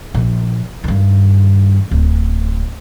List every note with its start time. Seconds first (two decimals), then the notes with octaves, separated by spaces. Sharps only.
0.14 A#1
0.84 G2 D#3
1.91 D1